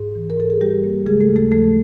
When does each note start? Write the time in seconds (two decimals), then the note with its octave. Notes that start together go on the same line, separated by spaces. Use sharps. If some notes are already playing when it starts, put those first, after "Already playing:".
Already playing: G#2 G#4
0.15 E3
0.30 A#4
0.37 G#2 A4
0.50 G#4
0.61 G3 G4
0.84 A#3
1.06 C#3 G#3 G#4
1.21 A3 A4
1.29 D#2
1.36 A3 A4
1.51 F3 A3 A4